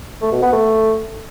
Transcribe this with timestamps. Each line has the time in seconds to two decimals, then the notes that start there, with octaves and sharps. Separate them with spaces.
0.22 A3
0.32 B2
0.42 B3
0.52 A3